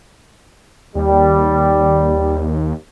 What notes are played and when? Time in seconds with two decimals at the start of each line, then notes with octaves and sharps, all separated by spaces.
0.95 D#2 G3